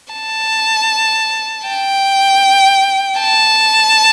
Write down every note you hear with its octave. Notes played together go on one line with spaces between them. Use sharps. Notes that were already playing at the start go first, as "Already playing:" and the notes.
A5
G5
A5